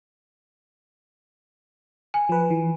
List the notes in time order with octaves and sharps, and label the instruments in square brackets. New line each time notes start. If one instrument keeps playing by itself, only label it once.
[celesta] G#5
[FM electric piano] F3 B4
E3